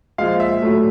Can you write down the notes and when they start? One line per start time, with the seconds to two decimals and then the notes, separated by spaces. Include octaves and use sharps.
0.18 A#2 F3 G#3 F5
0.40 E5
0.62 A2 F#3 A3